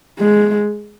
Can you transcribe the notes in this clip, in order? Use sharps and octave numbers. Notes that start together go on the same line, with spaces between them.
G#3